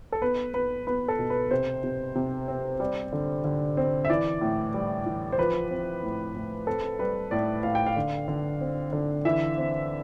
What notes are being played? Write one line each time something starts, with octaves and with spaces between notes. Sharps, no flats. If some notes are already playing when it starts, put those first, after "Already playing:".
A4
B3 B4
B3 B4
B3 B4
A4
B2
B4
C3 C5
C3
C3
C4
G3
D3
D3
C4
E5
E3 D5
A2
G3
E3
C5
F3 B4
C4
A2
A2
C4 A4
G3 B4
A2 D5
A2 F5
G5
F5
D3
D3
C4
D3
E3 E5
C4